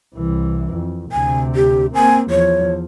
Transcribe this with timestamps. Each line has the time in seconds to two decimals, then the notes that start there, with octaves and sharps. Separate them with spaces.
0.15 C2 E3
0.73 F2
1.12 D2 C3 G#5
1.55 G4
1.95 A#3 C4 G#5
2.30 E2 F3 C#5